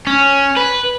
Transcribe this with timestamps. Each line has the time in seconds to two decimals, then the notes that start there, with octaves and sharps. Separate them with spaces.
0.07 C#4
0.57 B4